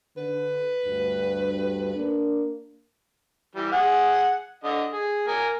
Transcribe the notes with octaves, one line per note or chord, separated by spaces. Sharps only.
D3 B4
D2 G2
A#3 D4
E3 G3
G#4 F#5
D3 D#5
G#4
A#3 G#5